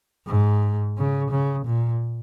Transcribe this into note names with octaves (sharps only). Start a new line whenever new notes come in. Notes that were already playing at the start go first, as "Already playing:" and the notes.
G#2
C#3
C#3
A#2